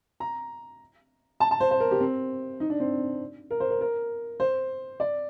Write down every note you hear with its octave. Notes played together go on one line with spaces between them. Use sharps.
A#5
A5
A5
C5
C5
A#4
G4
C4
D#4
D4
C4
A#4
C5
A#4
A#4
C5
D5